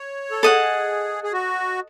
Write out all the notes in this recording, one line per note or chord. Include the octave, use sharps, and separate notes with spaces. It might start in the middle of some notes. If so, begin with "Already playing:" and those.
Already playing: C#5
A4
G#4 A4 D#5 F#5
G#4
F#4